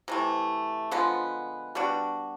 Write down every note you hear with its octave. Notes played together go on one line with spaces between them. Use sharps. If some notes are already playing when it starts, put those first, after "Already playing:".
C3 E3 A3
D3 F3 G#3 B3
G3 B3 D4 F#4